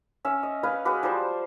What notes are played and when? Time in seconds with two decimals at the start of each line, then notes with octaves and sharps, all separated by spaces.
0.25 C#4 E5
0.43 D#5
0.63 B4 D#5 F5 G#5
0.85 G#3 F#4 B4 D6
1.03 F3 G3 C5 A5